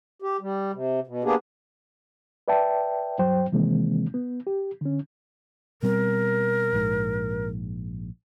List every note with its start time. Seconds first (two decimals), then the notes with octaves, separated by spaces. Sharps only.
0.22 G4
0.41 G3
0.73 C3
1.07 B2
1.24 A#3 B3 D4 G4 G#4
2.48 B4 D5 E5 G5 A5
3.19 G2 F#3 C5 G5
3.52 C3 D#3 E3 G#3 A#3 C4
4.14 B3
4.47 G4
4.81 D3 C#4
5.83 B2 G3 C4 A#4
6.73 A#1 G#2